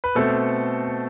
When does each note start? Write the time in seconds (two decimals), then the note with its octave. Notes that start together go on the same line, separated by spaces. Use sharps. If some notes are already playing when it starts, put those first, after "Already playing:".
0.04 B4
0.15 B2 A3 C4 A4